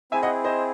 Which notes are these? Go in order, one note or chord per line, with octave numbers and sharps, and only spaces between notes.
C4 E4 G#4 E5 G#5
D#5 F#5
C5 D#5